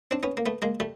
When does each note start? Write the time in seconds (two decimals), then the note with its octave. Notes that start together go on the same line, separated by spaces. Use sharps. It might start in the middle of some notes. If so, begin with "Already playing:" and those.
0.11 C4 D4
0.23 B3 C#4
0.37 A#3
0.46 A3 B3
0.62 G#3 A#3
0.80 G3 A3